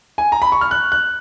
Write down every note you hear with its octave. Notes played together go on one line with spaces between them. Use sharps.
G#5
A#5
B5
C#6
F6
F#6
F#6